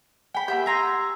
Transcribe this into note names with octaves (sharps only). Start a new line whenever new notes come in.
G5 G#5 B5
A#3 G4 E5 F#5 G6
G#5 A#5 C6 E6